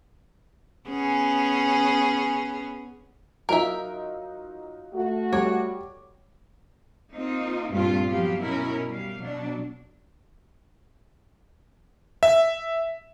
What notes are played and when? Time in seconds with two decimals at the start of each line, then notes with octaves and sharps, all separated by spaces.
0.89 B3 C#4 G#4
3.49 F#3 D#4 F4 A#4 E5
4.94 A3 F#4
5.33 G3 C#5 D6
7.14 A#3 C4 D#4 F4
7.71 G2 A#2 A3 C4 F4
8.06 F3 F#3 B3 G4 F5
8.39 B2 C#4 E4 A#4
8.89 G3 F5
9.20 B2 F#3 D4
12.23 E5